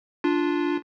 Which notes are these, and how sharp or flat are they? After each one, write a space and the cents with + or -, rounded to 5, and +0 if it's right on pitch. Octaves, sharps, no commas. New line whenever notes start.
D4 +0 F4 +0